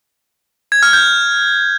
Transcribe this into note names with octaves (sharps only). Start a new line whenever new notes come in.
G#6
F6
G6